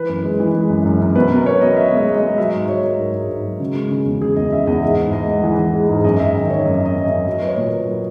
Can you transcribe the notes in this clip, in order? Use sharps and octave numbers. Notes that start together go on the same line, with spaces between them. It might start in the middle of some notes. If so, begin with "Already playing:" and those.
Already playing: E3 B4
F#2
G#3
E3
G#3
F#2
F#2
F#2
B2 B4
B2 A#4
B2 C#5
B2 D#5
B2 E5
G#3 E5
D#5
G#3
G#3 D#5
F#3 E5
G#2 D#5
F#3 C#5
F#3 A#4
G#2
G#2
G#2
F#3
C#3
G#3
C#3
E2
C#3 G#4
E2 D#5
C#3 E5
E2 D#5
G#2 E5
G#2
G#3 D#5
G#3
E3
E3
G#3
G#2
F#2 D#5
F#2 E5
D#3 D#5
D#3 C#5
F#2 D#5
F#2 D#5
F#2
F#2 E5
F#3 D#5
F#3 B4
C#5
A#2
A#2 A#4
F#3